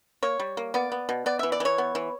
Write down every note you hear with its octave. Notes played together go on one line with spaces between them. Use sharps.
A#3 C#5
G3
A#3
B3 D5
B3
B2
B3 D5
E3 E5
D5
E3 C#5
B3
E3